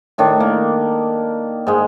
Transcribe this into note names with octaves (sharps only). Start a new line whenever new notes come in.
A2 D#3 D4
A#3
G#2 G#3